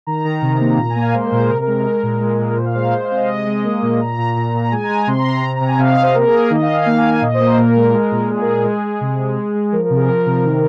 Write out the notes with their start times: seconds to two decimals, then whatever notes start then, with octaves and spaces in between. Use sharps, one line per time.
0.07 D#3 A#5
0.25 D#3
0.42 C3
0.60 A#3
0.78 A#2 A#5
0.90 G#5
0.96 A#3
1.02 F5
1.14 G#3 C5
1.25 A#4
1.32 A#2
1.38 G#4
1.50 C3 A#4
1.62 A#4
1.67 G#3
1.73 A#4
1.86 G#3
2.03 A#2
2.21 G#3
2.39 A#2
2.51 A#4
2.57 A#2 C5
2.66 F5
2.75 G#3 C5
2.84 A#4
2.92 G#3 C5
3.05 F5
3.11 C3
3.16 D#5
3.28 G#3
3.46 G#3
3.64 A#3
3.82 A#2
4.00 A#2 A#5
4.18 A#2
4.36 A#2
4.54 A#2
4.64 A#5
4.72 G#3 G#5
4.84 A#5
4.90 G#3
4.95 A#5
5.07 C3 C6
5.19 A#5
5.25 C3
5.43 C3 A#5
5.55 A#5
5.61 C3
5.67 G#5
5.79 C3 F5
5.91 D#5
5.97 C3
6.02 C5
6.14 A#3 A#4
6.27 G#4
6.33 A#3
6.39 A#4
6.50 D#3 D#5
6.62 F5
6.68 D#3
6.74 G#5
6.86 A#3 F5
6.98 G#5
7.04 A#3
7.10 F5
7.22 A#2 D#5
7.34 C5
7.40 A#3
7.46 A#4
7.58 A#2 A#4
7.76 G#3
7.94 G#3
8.12 A#2
8.29 G#3 G#4
8.41 A#4
8.47 G#3
8.53 A#4
8.65 G#3 G#4
8.83 G#3
9.01 C3
9.19 G#3
9.37 G#3
9.55 G#3
9.72 F3 A#4
9.85 A#4
9.90 C3
9.96 G#4
10.08 F3 A#4
10.26 C3
10.44 D#3